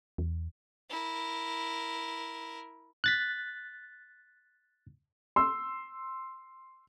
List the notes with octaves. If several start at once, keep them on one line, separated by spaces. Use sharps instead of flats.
E2
E4 A#4
F#6 A6 B6
C6 E6